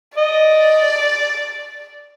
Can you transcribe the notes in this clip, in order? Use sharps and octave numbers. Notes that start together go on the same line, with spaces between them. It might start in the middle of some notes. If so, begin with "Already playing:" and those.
D5 D#5